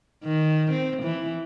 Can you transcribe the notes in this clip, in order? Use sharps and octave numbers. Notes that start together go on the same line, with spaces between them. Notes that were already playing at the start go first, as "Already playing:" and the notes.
D#3
C4
E3